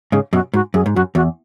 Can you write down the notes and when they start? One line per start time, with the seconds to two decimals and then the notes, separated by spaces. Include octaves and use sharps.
0.12 G#2 C#3 G#4
0.33 F#2 B2 F#4
0.54 G#2 F#4
0.74 F#2 G#4
0.86 G#2
0.95 F#2 F#4
1.15 E2 F#4